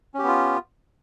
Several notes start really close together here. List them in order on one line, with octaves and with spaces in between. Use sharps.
C#4 G4 B3 F4